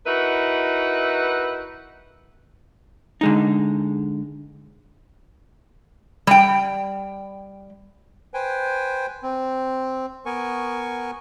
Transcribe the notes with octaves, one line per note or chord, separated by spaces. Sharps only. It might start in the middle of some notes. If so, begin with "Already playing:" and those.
D#4 E4 F#4 A#4 B4
D3 G#3 D#4
G3 G5
B4 C5 G5 G#5
C4
B3 A#4 G#5 C#6